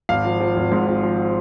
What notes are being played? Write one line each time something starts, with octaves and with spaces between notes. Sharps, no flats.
G#1 F5
F3
F3
G#1
G#2
G#1
F3